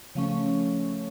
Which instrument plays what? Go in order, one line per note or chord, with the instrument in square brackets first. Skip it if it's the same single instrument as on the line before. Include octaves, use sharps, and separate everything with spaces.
[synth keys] C#3 F3 A3 C#4